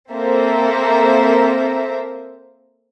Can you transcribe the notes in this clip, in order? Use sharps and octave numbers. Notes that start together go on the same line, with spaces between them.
A#3 C4 A4 C5 E5 A#5